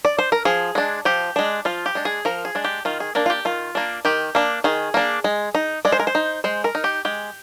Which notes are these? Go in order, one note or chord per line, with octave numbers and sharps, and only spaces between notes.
D5
C5
A#4
F3 G#4
G#3 D4
F3 G4
G#3 D4
F3 F4
G4
G#3 D4
G#4
F3 A#4
G#4
G#3 D4
G4
D#3 F4
G#4
A#3 D4 A#4
F4
G4
D#3 F4
A#3 D4
D#3 G4
A#3 D4
D#3 G#4
A#3 D4
G#3
D#4
G#3 D5
C5
A#4
C5
D#4
G#3 C5
A#4
D#4
G4
G#3 G4